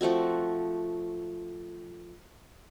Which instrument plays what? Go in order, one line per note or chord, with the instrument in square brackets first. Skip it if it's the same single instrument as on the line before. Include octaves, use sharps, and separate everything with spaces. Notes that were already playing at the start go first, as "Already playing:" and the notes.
[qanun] F3 A3 C4 F#4